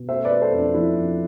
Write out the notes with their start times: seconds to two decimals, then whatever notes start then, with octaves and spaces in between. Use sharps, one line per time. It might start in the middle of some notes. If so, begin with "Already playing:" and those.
Already playing: B2
0.09 A3 C5 E5
0.25 B4 D5
0.31 A3
0.42 A4 C5
0.53 F2
0.58 D4
0.74 F3 E4
0.97 F2